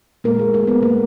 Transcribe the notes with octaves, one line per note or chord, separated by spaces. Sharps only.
A#2 G#3 A#3 A#4
G#3 G#4
A#3 A#4
B3 B4
A#3 A#4